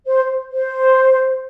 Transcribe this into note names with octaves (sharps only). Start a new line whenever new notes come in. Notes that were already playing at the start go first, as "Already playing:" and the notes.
C5
C5